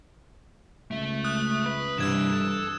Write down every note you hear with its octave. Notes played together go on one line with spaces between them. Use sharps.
C#2 A3 E5
D#6 F#6
B4
G2 C3 E3 E6 G#6 E7
A4